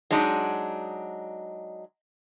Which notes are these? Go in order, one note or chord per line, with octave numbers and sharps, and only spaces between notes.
F#3 G#3 D4 D#4